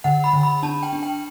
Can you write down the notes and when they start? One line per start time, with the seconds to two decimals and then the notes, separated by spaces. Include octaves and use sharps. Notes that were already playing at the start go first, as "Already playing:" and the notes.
0.04 D3 F#5
0.24 B5
0.33 D3
0.43 B5
0.63 D4 A5
0.83 G5
0.93 D4
1.03 G5